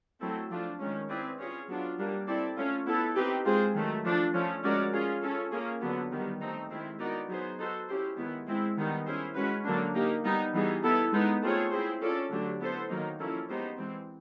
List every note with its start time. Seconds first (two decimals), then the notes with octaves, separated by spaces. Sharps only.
0.21 F#3 A3 C4 E4 A4
0.50 F3 A3 D4 F4
0.80 D#3 G#3 C#4
1.09 C4 E4 G#4 B4 D5
1.38 C#4 F4 G#4 C#5
1.68 F#3 B3 D4 F4
1.98 G3 A#3 D4
2.27 C4 E4 A4 D5
2.57 A3 C#4 F4
2.86 B3 E4 A4
3.16 C4 D#4 G4 B4
3.45 G#3 C4 F4 G#4 C5
3.74 D#3 F#3 A3
4.04 F3 A3 D4
4.33 F3 A3 C#4
4.63 G#3 C#4 F#4 A#4 D5
4.93 C#4 F4 G#4
5.22 C#4 F4 A4
5.51 A#3 C#4 F4 G#4
5.81 D3 F#3 B3
6.11 D#3 G3 B3
6.41 A3 C4 D#4
6.69 D#3 G#3 C4 E4
6.99 B3 D#4 F#4 A#4 D5
7.29 F#3 B3 D#4 G#4 C5
7.58 B3 D#4 F#4 A4 C5
7.88 C#4 E4 G4 C5
8.17 D#3 G#3 B3 E4
8.47 G#3 C4 E4
8.77 D#3 G3 B3 D#4
9.06 C#4 E4 G#4 C5
9.36 G#3 C#4 F#4 B4
9.65 D3 F#3 A#3 D4
9.95 A#3 D#4 G4
10.24 G3 B3 D#4
10.53 E3 G3 B3 D#4 G#4
10.83 B3 E4 A4
11.12 G#3 B3 D#4
11.43 A3 C4 F4 G#4 C#5
11.71 C4 E4 G#4 C5
12.01 C#4 F4 A4 D5
12.31 D3 F#3 A3 D4 G4
12.60 B3 E4 A4 C5
12.89 D#3 F#3 A#3 D#4
13.19 F3 A#3 C#4 E4 A4
13.49 G#3 B3 D#4 G4 C5
13.78 E3 G#3 C4